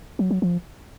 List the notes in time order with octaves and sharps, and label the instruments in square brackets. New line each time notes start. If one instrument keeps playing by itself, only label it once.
[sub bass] F#3
F#3
F3